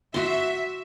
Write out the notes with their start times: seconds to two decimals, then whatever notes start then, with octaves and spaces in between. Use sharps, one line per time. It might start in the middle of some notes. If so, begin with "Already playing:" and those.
0.14 F#4 E5 C6